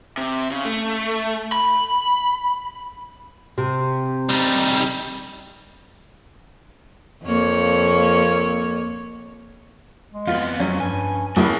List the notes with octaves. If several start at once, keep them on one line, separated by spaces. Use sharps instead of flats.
C3
C#3
A3
B5
C3
G3 D#4
F2 A#3 C#5
G#3
F2 B3 F4
F2 F#3 C#4
G2 G#5
C#2 A3 C4 E4 G#4 A#4